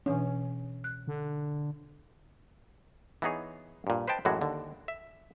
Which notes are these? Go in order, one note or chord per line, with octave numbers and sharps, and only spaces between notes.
B2 E3 C#4 D4
F#6
D3
E3 B3 D#4 G#4 C#5
G2 A#2
B4 C5 D#5 G5 A5
F#2 A2 E3 G#3 F#4
D#2 D3
E5